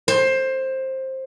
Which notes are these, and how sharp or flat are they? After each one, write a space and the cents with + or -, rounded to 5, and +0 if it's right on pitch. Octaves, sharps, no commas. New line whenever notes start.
C5 +15